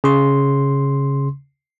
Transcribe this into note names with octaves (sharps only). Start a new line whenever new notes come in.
C#3 C6